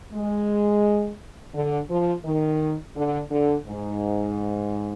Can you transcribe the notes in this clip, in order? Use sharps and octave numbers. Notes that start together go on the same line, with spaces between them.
G#3
D3
F3
D#3
D3
D3
G#2